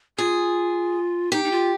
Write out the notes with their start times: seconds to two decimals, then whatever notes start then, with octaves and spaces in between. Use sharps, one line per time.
0.18 F4 G#4
1.32 D#4 G4
1.44 D#4
1.51 F4